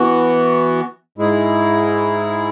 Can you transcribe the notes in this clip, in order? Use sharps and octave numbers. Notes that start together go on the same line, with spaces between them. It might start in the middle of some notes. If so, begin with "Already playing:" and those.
Already playing: E3 B3 F#4
G#2 G#3 E4 G#4